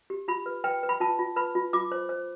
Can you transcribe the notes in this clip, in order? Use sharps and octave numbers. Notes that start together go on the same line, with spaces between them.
G4
F4 B5
B4
B4 G5
B4
B5
F4 A5
F4
B4 B5
F4
F4 D6
C5
C5